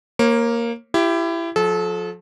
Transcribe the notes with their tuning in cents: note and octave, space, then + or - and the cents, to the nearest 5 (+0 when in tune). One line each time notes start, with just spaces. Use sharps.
A#3 +0 C#5 -35
E4 +25 G4 +0
F3 +35 A4 -30